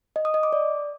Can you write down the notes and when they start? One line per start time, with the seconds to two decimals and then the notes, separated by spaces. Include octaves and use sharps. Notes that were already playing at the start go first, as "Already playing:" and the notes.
0.16 D#5
0.25 D#6
0.34 D#5
0.43 D6
0.53 D5